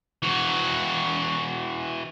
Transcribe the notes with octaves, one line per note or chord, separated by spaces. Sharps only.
E3 F#4